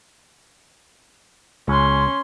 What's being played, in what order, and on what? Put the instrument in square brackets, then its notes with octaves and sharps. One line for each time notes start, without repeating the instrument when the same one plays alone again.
[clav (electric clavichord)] C#2 [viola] C#4 C6